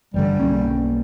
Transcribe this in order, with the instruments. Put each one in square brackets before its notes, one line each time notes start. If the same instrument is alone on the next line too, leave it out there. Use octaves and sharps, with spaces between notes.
[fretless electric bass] A1 G2 D3 [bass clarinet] G3
[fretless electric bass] B1 A#3 C#4